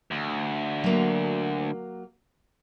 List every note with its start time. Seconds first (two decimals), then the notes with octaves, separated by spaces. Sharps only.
0.11 D2
0.84 F#3 A#3